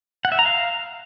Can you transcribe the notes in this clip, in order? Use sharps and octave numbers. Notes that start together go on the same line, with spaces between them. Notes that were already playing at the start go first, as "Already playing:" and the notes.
F#5
E5
A#5
F5